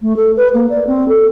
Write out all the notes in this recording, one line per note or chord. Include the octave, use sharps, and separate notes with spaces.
A3
A4
B4
A#3
D5
C4
A4